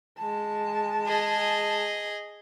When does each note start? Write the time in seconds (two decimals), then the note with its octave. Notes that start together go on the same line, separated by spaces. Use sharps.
0.18 G#3 A5
1.07 G#4 D#5